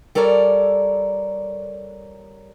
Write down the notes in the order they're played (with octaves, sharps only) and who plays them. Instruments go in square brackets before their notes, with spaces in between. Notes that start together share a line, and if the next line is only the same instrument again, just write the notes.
[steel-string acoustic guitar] G3 A4 A#4 C#5 D5